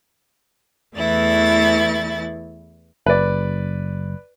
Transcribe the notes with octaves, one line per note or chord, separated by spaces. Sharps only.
E2 E3 A3 E4 A6
F#1 B4 D5